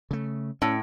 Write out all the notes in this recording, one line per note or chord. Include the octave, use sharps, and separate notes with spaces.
C#3 A3
A2 C#4